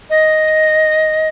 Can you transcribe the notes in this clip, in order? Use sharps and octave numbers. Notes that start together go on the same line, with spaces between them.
D#5